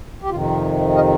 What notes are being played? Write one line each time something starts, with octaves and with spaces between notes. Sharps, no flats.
G4
F2 C3 D#3 F4
A#4 D#5